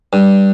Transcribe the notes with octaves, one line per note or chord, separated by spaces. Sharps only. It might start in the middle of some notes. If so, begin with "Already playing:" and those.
G2